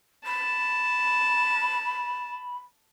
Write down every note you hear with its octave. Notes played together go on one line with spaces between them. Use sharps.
A5 B5